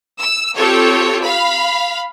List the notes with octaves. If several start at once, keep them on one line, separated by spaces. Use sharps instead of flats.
E6
C4 F4 G4 A4 C#5
F5 B5